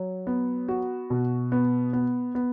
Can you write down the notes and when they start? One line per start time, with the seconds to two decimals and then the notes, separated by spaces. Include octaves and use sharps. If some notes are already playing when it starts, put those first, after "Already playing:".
Already playing: F#3
0.27 B3
0.68 F#4
1.10 B2
1.52 B3
1.93 B3
2.35 B3